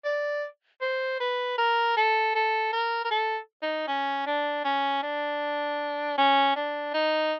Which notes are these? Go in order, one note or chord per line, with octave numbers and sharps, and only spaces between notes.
D5
C5
B4
A#4
A4
A4
A#4
A#4
A4
D#4
C#4
D4
C#4
D4
C#4
D4
D#4